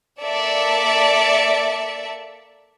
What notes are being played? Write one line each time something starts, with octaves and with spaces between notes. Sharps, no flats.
A#3 A4 D5 E5 A5 C#7